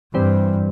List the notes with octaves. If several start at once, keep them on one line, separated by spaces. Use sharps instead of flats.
G2 E3 G3 C4